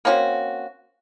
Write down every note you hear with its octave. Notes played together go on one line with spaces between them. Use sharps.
A#3 C4 C#4 F#4